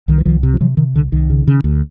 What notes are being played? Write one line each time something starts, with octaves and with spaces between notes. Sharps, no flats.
C2 D#3
E3
C2 D#3 F3
C3
F3
C3 E3 F#3
C3 D#3
C2 D3
C2 D#3
C#3
C#3
D2